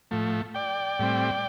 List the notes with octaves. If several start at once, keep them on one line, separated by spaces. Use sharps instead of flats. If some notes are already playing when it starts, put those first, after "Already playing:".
A2 F3 A3
D5 G5
A2 G3 C4